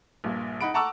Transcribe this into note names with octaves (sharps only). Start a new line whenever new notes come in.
A#1 G2 A#2
D#4 F#5 B5 D7
F#5 A5 A#5 C#6 D6 E6